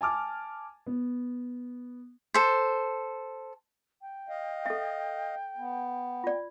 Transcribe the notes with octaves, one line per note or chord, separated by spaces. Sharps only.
G#5 A5 D6 F6
B3
A4 C5
G5
D#5 F5
A4 E5
B3
F4 D5